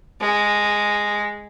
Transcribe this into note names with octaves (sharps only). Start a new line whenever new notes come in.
G#3